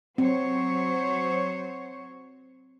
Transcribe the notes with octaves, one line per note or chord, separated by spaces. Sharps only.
F#3 C4 C5 C#5